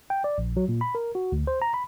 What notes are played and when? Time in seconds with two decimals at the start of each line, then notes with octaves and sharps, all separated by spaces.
0.10 G5
0.24 D5
0.38 A#1
0.57 F#3
0.69 A#2
0.81 B5
0.95 A#4
1.15 F#4
1.32 D2
1.47 C5
1.62 A#5
1.74 B5